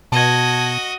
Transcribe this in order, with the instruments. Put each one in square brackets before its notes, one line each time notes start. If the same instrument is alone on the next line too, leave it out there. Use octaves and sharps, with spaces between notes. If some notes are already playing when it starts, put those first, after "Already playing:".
[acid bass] B2 [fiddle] F#4 D#5 [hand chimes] A5 G#6